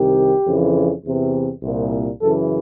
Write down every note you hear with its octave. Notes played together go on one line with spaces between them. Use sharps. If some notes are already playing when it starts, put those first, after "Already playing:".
Already playing: C2 C3 D#3 G4
F2 C#3 E3
E2 C3 E3
C2 A#2
F#2 C#3 E3 A4